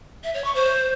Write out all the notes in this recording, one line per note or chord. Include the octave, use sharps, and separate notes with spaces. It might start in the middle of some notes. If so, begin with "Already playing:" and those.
E5
C#5
C#6
C5